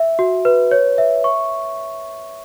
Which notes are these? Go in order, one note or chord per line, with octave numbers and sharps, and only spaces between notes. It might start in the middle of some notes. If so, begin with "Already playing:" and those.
Already playing: E5
F#4
B4
C#5
E5
C#6